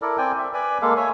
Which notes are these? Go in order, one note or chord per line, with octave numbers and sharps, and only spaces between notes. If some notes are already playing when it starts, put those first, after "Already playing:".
E4 A4 A#4 D5
C4 D5 G5 G#5
E5
B4 D5 G#5 B5
G#3 A#3 A4 F5
C#5 E5 G#5